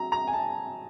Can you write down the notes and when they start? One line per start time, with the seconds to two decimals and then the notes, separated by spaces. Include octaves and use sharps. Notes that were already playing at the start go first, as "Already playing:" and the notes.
Already playing: F#3 A#5
0.12 A#5
0.27 G#5
0.33 A5